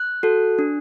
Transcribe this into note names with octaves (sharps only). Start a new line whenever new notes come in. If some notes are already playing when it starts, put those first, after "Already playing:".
Already playing: F#6
F#4 A4
D4